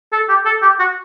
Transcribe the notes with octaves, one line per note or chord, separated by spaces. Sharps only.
A4
G4
A4
G4
F#4